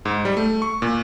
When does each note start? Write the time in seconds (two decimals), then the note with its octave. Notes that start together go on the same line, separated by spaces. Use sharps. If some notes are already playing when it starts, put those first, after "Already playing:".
0.05 G#2
0.25 G3
0.37 A3
0.62 C#6
0.82 A#2